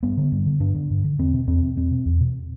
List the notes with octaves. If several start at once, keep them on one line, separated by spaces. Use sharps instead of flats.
G2 B3
D3
G2
D3
G2 D4
D3
G2
D3
E2 C4
B2
E2 C4
B2
E2 C4
B2
E2
B2